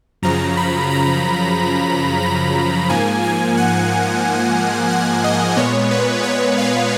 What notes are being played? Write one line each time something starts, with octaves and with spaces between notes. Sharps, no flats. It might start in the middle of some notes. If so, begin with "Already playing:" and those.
F#2 C#3 F3 A#5
B5
A#5
A#5
G#2 F3 A#3 G#5
G#5
F#5
F#5
D#5
A#2 G#3 B3 C#5
B4
C#5
F5